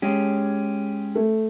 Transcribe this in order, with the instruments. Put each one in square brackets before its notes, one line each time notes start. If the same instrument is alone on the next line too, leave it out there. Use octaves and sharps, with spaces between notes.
[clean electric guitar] G#3 C#4 G4
[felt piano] A3